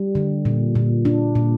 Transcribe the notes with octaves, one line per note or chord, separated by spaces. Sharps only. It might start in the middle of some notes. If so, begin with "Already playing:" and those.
Already playing: G3
D3
A#2
A#2
D4
A#2